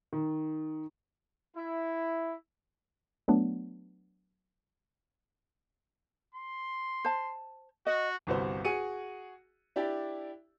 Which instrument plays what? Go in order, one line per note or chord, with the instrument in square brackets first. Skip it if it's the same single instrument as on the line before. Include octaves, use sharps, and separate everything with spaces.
[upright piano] D#3
[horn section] E4
[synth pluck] F#3 A3 B3 D4
[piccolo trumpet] C6
[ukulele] C5 A5
[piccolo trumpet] F#4 [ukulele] D#5
[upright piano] G1 C2 F#4 C5
F#4 G#4 C#7 D#7
D4 E4 G4 D5